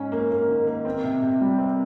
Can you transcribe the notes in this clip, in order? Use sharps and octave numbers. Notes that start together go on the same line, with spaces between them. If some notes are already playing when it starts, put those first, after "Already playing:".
Already playing: G#2 C#4
A#3
A#3
D#3
A#3
C4
C3
C3
G3
C4